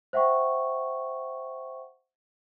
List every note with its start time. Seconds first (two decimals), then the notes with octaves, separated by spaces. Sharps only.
0.13 C5 E5 F#5 G5 C#6